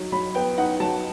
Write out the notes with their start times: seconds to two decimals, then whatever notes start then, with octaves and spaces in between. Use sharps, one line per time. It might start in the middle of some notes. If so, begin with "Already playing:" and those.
Already playing: F#3 D#4
0.12 F#3 B5
0.35 B3 G5
0.58 D#4 F#5
0.80 F#3 A5